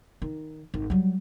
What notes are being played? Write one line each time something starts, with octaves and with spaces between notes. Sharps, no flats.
D#3
G#1
F#3 G3